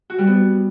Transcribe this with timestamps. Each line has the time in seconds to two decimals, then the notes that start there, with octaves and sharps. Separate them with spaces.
0.10 F#4
0.18 G3
0.27 B3